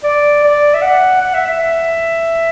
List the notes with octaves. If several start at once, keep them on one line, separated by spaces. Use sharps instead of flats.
D5
D5
E5
F#5
F#5
E5
E5
E5